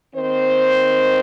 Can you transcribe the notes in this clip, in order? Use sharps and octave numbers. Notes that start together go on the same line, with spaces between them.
D#2 D#3 C4 C5